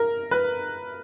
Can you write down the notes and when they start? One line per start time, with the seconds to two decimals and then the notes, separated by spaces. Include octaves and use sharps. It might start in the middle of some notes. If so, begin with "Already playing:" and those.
Already playing: A#4
0.31 B4